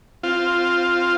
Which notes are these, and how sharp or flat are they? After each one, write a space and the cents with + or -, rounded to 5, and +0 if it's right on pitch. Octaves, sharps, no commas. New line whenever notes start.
C4 +0 F4 +0